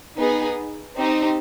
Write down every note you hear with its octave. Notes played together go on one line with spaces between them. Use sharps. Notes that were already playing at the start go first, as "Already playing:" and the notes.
B3 D#4 G#4 B4
C4 D#4 G4 C5